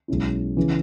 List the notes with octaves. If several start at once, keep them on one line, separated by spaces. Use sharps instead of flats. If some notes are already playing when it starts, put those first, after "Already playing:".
B1 B2 G#3 C#4 E4
C#3 E3